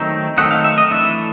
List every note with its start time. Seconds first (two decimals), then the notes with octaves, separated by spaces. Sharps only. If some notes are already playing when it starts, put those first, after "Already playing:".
Already playing: D#3 F#3 A3 C4 D#4
0.38 D#3 F#3 A3 C4 D#4 F#5
0.51 F5
0.64 E5
0.78 D#5
0.91 E3 A3 D4 E5